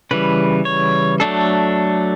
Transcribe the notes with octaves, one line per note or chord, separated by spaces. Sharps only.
C#3 E3 G3 B4
C#5
F#3 A3 D4 A4